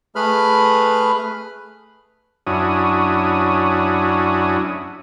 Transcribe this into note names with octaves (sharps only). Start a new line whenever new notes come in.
A3 G#4 B4 B5 F6
F#2 C#4 D4 E4 F#4 D#6